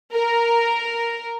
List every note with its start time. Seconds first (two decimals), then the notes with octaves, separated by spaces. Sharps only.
0.13 A#4